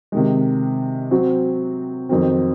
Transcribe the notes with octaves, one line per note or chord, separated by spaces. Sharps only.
C3 D#3 G#3
F#3 C4 F#4
F2 D#3 F#3 C4